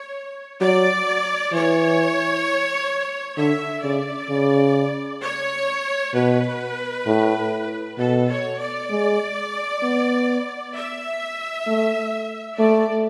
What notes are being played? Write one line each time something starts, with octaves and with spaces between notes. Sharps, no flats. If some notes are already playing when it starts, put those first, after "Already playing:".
Already playing: C#5
F#3 D5
E3 C#5
D3 E5
C#3 D5
C#3
C#5
B2 B4
A2
B2 A4
C#5
D5
G#3
B3
E5
A3
A3 D5